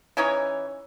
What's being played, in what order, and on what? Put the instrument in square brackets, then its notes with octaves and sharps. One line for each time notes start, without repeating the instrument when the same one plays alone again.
[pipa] E3 C#4 D#4 C#5